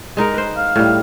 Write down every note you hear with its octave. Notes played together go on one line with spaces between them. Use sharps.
G#3 D#4 A#4
B4 C5
F5
A2 G3